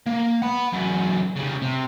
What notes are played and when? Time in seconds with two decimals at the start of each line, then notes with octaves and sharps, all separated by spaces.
0.06 A#3
0.42 F#5 B5
0.73 F#2 E3
1.36 C#3 G3
1.62 C3